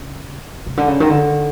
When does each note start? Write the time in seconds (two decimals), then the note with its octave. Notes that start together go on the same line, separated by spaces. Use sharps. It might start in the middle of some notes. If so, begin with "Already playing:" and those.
Already playing: C#3
0.67 C3
0.77 D3
0.88 C#3
1.00 D#3
1.09 D3